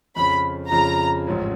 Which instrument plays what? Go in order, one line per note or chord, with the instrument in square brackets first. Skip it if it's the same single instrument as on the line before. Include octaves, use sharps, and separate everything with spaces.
[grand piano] F2 C#3 F3 [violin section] B5
[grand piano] F2 C#3 F3 [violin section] A#5
[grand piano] A1 G#2 F3 G#3 C#4